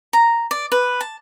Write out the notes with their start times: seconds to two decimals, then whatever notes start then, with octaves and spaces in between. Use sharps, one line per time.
0.13 A#5
0.51 D5
0.72 B4
1.01 A5